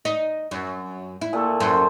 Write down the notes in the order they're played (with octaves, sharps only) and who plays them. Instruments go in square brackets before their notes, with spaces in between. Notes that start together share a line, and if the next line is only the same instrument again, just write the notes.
[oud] D#4
F#2
E4
[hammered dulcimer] A#2 A3 A4
[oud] F#2 [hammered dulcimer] C5